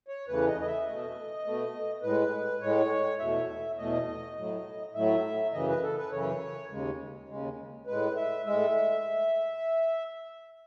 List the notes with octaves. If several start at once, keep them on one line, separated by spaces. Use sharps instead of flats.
C#5
E2 C#3 E3 A3 B4
D#5
D#5
E5
B2 A3 D#5
B2 A3
A2 G#3 B4
A2 G#3 C#5
E2 B2 A3 E5
E2 B2 A3 D#5
A2 F#3 A3
A2 F#3 A3 E5
F#2 C#3 E3 D#5
B4
A4
B4
F#2 C#3 E3 C#5
D#2 C#3 G#3
D#2 C#3 G#3
A2 G#3 B4
E5
A2 G#3 E5